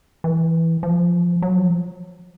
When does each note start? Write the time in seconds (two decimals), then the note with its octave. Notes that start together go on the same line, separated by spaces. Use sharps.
0.24 E3
0.83 F3
1.42 F#3
1.57 F3